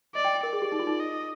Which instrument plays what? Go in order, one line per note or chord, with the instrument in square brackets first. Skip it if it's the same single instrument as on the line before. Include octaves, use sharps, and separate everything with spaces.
[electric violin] D5 [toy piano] D#5
[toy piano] G5
G5
[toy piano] A#4 [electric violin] D5
[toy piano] G#4
G4
D#4
F4
D#4
[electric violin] D#5